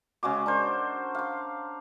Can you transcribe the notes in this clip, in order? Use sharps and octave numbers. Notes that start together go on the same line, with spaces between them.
C#3 G#3 F#4 D6
D4 A#4 C5
F5 C6